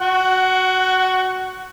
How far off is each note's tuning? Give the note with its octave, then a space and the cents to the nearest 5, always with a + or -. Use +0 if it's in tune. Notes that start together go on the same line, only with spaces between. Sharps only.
F#4 +0 F#5 +20